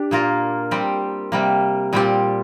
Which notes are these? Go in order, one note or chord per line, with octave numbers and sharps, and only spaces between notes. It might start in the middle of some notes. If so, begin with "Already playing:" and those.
Already playing: D4 G4
A#2 A#3 F4 A#4
G3 C4 G4
C3 G3 A#3
A#2 G3 C4 G4